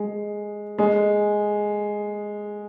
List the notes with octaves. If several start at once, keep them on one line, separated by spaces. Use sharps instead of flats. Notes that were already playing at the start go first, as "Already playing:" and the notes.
Already playing: G#3
G#3